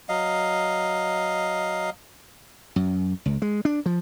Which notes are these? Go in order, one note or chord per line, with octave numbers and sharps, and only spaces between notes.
F#3 D#5 F5
F#2
C#2
G#3
D4
F3